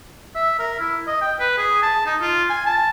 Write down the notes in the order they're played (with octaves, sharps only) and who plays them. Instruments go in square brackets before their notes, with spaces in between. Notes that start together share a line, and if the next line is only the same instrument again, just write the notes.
[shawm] E5
A#4
E4
D#5
G5
B4
G#4
A5
D#4
F4
G#5
A5